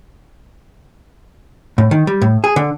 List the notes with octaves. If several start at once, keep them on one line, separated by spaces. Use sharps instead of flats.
A2
D#3
G3
A2
G#4
D3